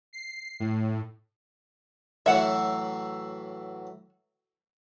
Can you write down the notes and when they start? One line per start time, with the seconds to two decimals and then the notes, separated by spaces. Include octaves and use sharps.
0.13 C7
0.60 A2
2.26 A2 E3 F#3 E5 F#5